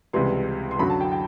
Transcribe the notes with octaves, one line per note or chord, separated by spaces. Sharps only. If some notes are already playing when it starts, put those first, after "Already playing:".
C#2 C3 E3 G3 C6
C6
F#2 D3 F#3 B5
A5
G5
G5